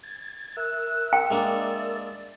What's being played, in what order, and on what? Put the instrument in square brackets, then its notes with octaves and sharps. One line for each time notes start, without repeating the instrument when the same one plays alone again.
[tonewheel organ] G#6 A6
[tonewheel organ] A#4 E5 E6 [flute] F#6
[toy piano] G5
[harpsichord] G#3 A#3 D4 [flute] D5